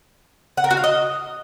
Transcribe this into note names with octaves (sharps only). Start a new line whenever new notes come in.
F#5
A#4
F#4
F5
D#5